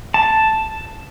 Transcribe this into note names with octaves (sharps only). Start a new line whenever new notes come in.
A5